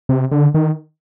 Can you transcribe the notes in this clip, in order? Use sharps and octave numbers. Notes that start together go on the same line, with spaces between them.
C3
D3
D#3